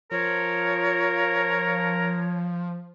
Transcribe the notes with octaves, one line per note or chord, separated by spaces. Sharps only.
F3 A#4 C#5